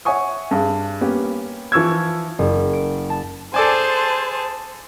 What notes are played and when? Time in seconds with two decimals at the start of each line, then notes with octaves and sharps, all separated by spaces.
0.05 C#5 E5 F#5 G#5 C#6 D#6
0.51 G2 G#4
1.01 A#3 B3 C#4 G4
1.72 E3 F3 C#6 E6 G#6
2.39 F#1
2.73 D7
3.10 A5
3.54 G#4 A4 C5 D5 G#5 A5